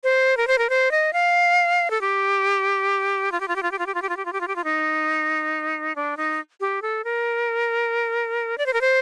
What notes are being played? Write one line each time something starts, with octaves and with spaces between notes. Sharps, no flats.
C5
A#4
C5
A#4
C5
D#5
F5
A4
G4
F4
G4
F4
G4
F4
G4
F4
G4
F4
G4
F4
G4
F4
G4
F4
G4
F4
D#4
D4
D#4
G4
A4
A#4
D5
C5
A#4
C5